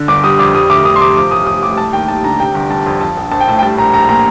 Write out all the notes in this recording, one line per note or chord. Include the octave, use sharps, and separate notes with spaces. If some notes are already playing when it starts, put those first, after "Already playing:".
Already playing: D3
G1 D6
G3 D#6
F2 D6
G3 D#6
D2 D6
D2 D#6
C6
C3 D6
F3 D6
A1 D#6
A1 D#6
A2 D6
G3 A5
D#2 G5
D#2 A5
D3 A#5
C3 G5
G1
G3 A5
F2
F3 A5
A#1
A#1 A5
G5
A2 A5
G5
G3 A5
A#1 A#5
A#1 A#5
A#2 A#5